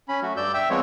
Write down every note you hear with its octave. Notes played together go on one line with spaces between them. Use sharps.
C#4 B5
F#3 A3 F#4
G2 D5 E6 G6
E5 G5 E6
F3 G#3 B3 C4 C#5